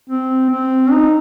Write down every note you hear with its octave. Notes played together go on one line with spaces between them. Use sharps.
C4
C4
D#4